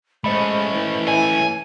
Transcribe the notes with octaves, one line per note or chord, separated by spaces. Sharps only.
G#3 A3 C#4 C5 D#5 B5
E3
G#5